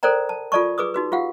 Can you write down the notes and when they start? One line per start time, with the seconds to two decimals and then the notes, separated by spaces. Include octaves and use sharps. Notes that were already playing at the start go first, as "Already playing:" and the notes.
0.03 A4 A#4 C5 D5 G5 A#5
0.29 A5
0.52 F4 A4 D5 A5 C#6
0.78 G#4 B4 D6 D#6
0.94 D#4 F#4 B4
1.12 F4 G4 F5 F#5